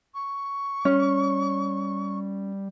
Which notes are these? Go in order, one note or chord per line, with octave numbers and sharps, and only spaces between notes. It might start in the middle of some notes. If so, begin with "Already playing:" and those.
C#6
G3 C#4